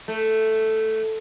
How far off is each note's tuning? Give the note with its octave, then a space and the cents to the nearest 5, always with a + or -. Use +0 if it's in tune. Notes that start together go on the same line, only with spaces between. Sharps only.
A3 +0